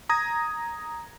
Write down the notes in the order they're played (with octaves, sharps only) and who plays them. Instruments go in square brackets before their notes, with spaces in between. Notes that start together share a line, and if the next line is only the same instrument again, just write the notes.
[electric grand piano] A#5 D#6 G#6 A#6